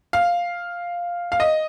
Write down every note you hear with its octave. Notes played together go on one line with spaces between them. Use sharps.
F5
F5
D#5